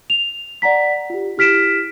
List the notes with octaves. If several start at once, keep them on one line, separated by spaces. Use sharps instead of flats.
F7
D5 F#5 A#5 B6
F4 G4
E4 G4 F6 B6 D7 E7